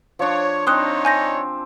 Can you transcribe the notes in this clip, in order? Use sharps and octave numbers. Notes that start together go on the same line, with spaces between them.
F3 D4 C#5
C4 D4 D#4 C#5 C6 D#6 F#6
G#5 G6 A#6